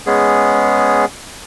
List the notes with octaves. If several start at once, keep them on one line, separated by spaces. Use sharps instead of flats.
G#3 B3 C#4 G#4